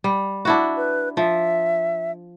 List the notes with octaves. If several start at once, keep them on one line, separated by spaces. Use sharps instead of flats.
G3
D4 E4 F#4
B4
F3 E5